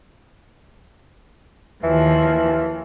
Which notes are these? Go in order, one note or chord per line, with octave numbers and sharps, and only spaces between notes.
D#2 E3 F3